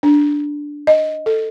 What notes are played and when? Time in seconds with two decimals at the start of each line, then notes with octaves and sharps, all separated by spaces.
0.03 D4
0.87 D#5
1.26 A4